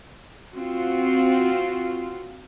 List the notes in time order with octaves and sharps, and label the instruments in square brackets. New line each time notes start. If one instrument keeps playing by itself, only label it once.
[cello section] C4 F4 F#4